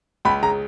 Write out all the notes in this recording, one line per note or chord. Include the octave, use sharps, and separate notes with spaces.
C#2 B5
C#3 A#5